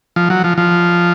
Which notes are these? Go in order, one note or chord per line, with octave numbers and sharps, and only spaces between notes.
F3
F#3
F3
F3